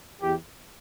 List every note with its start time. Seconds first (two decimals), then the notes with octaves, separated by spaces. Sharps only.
0.21 E2 E3 G4